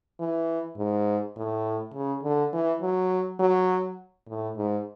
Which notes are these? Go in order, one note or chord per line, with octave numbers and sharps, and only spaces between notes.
E3
G#2
A2
C#3
D3
E3
F#3
F#3
A2
G#2